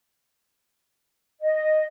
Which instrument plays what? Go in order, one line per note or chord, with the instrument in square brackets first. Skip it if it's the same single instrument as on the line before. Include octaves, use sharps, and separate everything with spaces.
[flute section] D#5